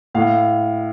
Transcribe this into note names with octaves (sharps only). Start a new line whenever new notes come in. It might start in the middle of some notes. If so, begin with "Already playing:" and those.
A2 F5